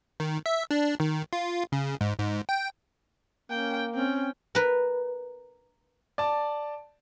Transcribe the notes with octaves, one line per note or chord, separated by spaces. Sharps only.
D#3
E5
D4
D#3
F4
C#3
G#2
G#2
G5
A#3 C#4 G5
C4 C#4 G5
A#4 B4
D5 A5